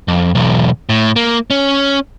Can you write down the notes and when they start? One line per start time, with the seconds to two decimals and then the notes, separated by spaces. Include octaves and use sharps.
0.08 F2
0.35 B1 E2
0.89 A2
1.16 A#3
1.50 C#4